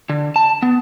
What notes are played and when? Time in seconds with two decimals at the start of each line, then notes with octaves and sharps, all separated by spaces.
0.09 D3
0.36 A5
0.62 B3